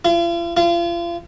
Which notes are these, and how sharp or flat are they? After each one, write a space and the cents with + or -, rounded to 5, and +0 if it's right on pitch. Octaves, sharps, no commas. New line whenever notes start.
F4 -45
F4 -35